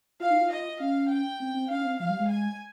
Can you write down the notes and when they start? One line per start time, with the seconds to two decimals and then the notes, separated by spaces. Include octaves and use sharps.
0.20 F4 F5
0.30 D#4
0.41 F4
0.51 D#5
0.80 C#4 F5
1.11 G5
1.40 C4
1.54 C4
1.70 C#4 F5
1.81 C#4
1.85 C4
2.00 F3 F5
2.09 G3
2.19 G#3
2.29 G#5